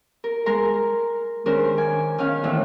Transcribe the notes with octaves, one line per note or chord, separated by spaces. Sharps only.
A#4
G#3 A#4 A#5 C6
D#3 G#3 C#4 D4 A#4 C5
G#5 D6
D#3 C#4 F5
A2 E3 C4 D4